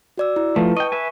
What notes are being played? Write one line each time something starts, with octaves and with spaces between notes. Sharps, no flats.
F#4 D5 E6
E4
F3 A3 B4 A5
D#5 G5 C#6
B4 E5 G#5